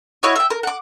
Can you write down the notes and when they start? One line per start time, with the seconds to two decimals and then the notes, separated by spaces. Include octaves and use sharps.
0.23 E4 F#4 C#5 D#5
0.36 E5 G5
0.50 A#4
0.63 F#5 D6